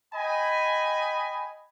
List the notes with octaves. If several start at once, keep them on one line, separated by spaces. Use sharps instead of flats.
D#5 G5 G#5 B5